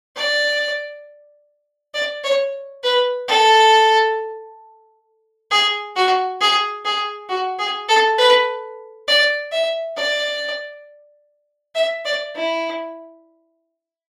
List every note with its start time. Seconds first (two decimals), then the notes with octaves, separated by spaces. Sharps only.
0.16 D5
1.94 D5
2.24 C#5
2.84 B4
3.28 A4
5.51 G#4
5.96 F#4
6.41 G#4
6.85 G#4
7.29 F#4
7.59 G#4
7.89 A4
8.18 B4
9.08 D5
9.52 E5
9.97 D5
11.75 E5
12.05 D5
12.35 E4